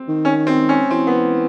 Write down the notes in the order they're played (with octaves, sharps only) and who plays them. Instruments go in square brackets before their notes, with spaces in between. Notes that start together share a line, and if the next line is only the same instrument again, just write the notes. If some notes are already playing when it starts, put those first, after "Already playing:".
Already playing: [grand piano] C4
[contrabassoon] D#3
[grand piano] C#4
C4
C#4
[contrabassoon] E3 [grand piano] C4
[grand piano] B3